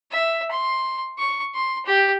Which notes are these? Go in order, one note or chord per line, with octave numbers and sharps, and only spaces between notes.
E5
C6
C#6
C6
G4